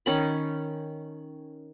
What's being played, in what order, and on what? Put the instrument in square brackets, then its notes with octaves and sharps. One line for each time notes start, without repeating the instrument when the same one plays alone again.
[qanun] D#3 C#4 B5